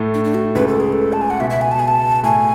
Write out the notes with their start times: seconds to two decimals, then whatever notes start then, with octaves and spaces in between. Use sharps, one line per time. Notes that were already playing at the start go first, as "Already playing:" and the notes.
Already playing: A2 A3
0.14 D4
0.24 D4
0.34 F#4
0.55 C#2 C#3 B4
0.68 A4
0.80 G#4
0.92 A4
1.13 A5
1.21 G#5
1.30 F#5
1.40 B2 E5
1.50 E5
1.61 G#5
1.71 A5
1.79 G#5
1.88 A5
2.23 A2 G#5